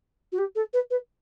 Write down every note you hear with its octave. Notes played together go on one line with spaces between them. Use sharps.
F#4
G4
A4
B4
B4